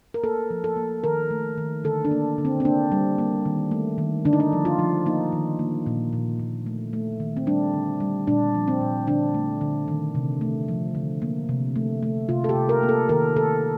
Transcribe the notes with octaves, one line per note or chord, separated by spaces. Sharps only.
A#4
A#3 A4
F3
A4
A#3
D#3 A#4
A3
D#3
D3 A4
D4
A#3
D3
C4
C4
A#3 D4
G3
A#3
D#3
A3
D#3
D3 D4
D#4
D4
F3
F4
F3
A#3 D#4
D#3
A#3
A#2
A#2
A#2
A3
A3
D#3
C4
G3 D4
D3
G3
A#2 D4
F3
C4
A#2
D3 D4
A3
D3
D#3
C3
A3
F3
D3
A#3
C3
A3
A3
C3 F4
A4
G4
C3
A#4
A#3
A4
D#3 A#4
D#3 A4